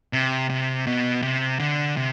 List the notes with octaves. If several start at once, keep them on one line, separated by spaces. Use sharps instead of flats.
C3
C3
B2
C3
D3
C3